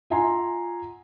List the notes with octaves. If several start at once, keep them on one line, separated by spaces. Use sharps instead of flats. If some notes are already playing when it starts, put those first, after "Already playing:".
F4 E5 F#5 G#5 A#5 C6